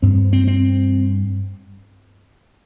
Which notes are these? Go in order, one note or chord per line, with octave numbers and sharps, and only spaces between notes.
G2 C4
C4
C4